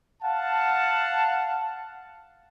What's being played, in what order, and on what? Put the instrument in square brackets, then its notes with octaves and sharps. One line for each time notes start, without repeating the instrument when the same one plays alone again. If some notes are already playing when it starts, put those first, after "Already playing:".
[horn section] F5 F#5 A5